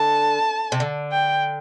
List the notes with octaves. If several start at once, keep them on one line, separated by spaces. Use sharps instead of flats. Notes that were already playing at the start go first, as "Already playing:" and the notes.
Already playing: D3 A5
C3
D3
G5